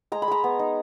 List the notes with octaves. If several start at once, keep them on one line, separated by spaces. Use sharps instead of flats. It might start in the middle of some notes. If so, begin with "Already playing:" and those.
G#3 A#5
B5
G#3 A#5
B3
D#4